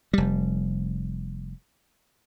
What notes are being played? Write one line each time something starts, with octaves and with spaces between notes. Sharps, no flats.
F1 G3